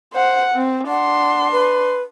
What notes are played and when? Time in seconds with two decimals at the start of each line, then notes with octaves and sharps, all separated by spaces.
0.13 C5 F#5
0.55 C4
0.88 D4 F#5 C6
1.51 B4